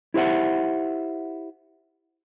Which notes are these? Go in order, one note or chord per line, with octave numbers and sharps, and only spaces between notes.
E4 G4 C5 E5 F#5